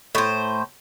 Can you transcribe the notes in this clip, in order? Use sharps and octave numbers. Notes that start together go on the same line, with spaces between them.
A2 C5